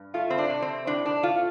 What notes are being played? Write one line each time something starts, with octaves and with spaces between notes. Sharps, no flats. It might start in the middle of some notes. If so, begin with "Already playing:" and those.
Already playing: G2
A3 F4
C4
D4
C3
C4
A2 D4
D4
A3 F4